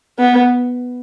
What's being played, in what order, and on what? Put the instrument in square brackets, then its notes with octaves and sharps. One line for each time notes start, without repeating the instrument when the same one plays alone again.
[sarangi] B3